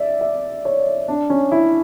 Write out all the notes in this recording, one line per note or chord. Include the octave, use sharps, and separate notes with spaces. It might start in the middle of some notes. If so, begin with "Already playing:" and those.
Already playing: D5 E5
E5
C#5
D4
C#4
E4